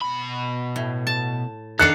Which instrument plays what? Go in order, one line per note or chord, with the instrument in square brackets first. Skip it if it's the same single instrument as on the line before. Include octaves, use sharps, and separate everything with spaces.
[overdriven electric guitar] B2 B5
[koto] A2
A5
[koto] D#3 D4 F5 [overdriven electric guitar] A4 [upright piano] F#6 C#7